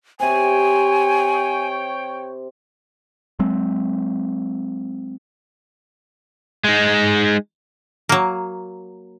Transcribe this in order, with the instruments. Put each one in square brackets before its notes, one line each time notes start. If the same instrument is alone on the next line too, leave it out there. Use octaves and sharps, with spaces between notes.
[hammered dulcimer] C3 C5 [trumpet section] C#5 G5 [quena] G#5
[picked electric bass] F#3 G#3 C4
[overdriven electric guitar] G#3 D#4
[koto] F#3 A#3